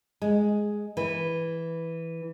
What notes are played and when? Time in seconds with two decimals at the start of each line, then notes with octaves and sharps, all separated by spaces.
0.22 G#3
0.97 E3